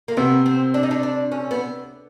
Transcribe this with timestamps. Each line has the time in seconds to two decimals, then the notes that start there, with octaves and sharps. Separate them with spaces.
0.08 A#3
0.17 C3 B3
0.46 C4
0.74 D4
0.83 D#4
0.91 D4
1.03 D4
1.31 C#4
1.51 B3